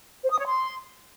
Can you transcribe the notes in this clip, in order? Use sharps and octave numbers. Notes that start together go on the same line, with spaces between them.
C5
D#6
C#5
C6